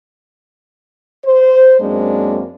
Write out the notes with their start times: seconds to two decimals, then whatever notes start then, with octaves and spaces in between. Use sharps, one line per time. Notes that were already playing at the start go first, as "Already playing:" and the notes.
1.23 C5
1.80 F#2 G#3 A#3 C4 D4